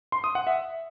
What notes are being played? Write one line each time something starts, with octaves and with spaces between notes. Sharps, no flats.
C6
D#6
F#5
E5